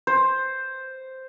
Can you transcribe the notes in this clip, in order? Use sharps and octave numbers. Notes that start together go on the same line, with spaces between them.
C5